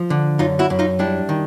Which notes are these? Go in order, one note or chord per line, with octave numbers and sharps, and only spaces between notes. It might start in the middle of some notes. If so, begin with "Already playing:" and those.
Already playing: F3
D3
F#2 D#4 F4
E4 F#4
F#2
D#4 F4
G3 D4 E4
D#3